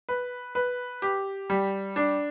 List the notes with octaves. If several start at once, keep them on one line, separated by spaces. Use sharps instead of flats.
B4
B4
G4
G3
D4